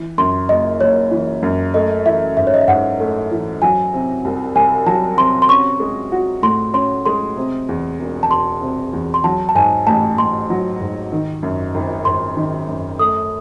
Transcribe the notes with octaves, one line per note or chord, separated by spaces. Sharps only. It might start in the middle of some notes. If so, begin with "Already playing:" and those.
Already playing: E3
F#2 C6
F#1 D#5
F#1 C#5
E3
F#2
A3 D#5
E3 E5
G#2 E5
C#5
D#5
E5
G#2 F#5
A3
E3
F#3 G#5
C3
C2
C2 G#5
F#3 A5
C3 C6
C6
C#4 C#6
G#3
F#4
A2 C6
C#4 C6
G#3 C6
C3
E2
E1
A5
E1 C6
C3
E2
C6
F#3 A5
A5
G#2 G#5
A1 A5
A1 C6
F#3
G#2
D#3
F#2
G#1
G#1 C6
D#3
F#2
A3 D#6